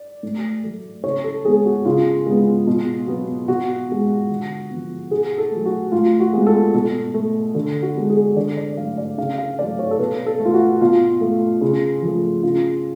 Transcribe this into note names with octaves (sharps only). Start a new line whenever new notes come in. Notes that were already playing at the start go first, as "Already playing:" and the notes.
Already playing: D5
A2
F#3 A3
C#3 C#5
A4
G#3 B3 G#4
F#4
C#3 F4
G#3 B3
B2
F#3 B3
B2 F#4
G#3 B3
D3
F3 B3
B2 G#4
A4
F#3 A3
F#4
A2 F4
F#4
G#3 B3
A4
B2 A4
A3
D3
F#4
G#3 B3
G#4
D3 D5
D5
D5
F#3 A3 F5
D5
C#3 F5
F5
F#3 A3 D5
C#5
A4
B2 B4
A4
A3
F4
F#4
B2 F4
A3
C#3
F3 A3
C#3 F4